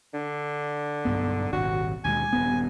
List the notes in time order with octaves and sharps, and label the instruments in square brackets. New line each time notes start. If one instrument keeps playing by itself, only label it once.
[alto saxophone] D3
[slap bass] B1 G2 B3
[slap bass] D#1 G#1 C3 [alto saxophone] F#4
[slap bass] D#2 B2 G#3 [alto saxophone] G#5
[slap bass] D#1 G2 B3